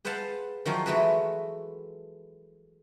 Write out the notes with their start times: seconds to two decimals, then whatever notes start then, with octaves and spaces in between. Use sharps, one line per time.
0.05 G#4 B4 C5 F5 F#5 A5
0.65 D#3 F3 F#3 F4 G#4
0.86 E3 G#3 A3 F#4 G#4 B4